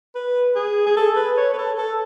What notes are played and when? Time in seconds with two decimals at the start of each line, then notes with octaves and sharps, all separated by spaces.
0.15 B4
0.55 G#4
0.86 G#4
0.96 A4
1.16 B4
1.37 C#5
1.53 B4
1.58 A4
1.78 A4